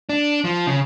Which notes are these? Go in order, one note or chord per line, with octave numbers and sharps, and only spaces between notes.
D4
F3
C#3